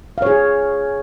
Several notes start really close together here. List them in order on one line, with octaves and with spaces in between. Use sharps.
F5 C#5 G#4